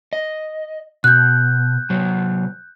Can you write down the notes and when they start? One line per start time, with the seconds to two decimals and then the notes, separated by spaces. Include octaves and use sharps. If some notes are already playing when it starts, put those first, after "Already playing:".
0.13 D#5
1.04 B2 F#6 G6
1.90 C3 F#3